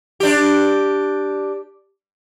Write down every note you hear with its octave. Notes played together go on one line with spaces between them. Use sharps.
D4 G4